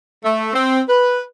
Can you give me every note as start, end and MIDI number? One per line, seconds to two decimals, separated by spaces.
0.24 0.51 57
0.53 0.80 60
0.88 1.22 71